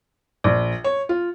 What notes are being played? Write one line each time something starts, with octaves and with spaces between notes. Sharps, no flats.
A#1
C#5
F4